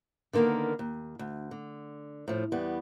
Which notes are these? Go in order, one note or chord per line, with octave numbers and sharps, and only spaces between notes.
D3 D#3 A#3 B3
D#2
D2
D3
A2 F3
E2 G3 B3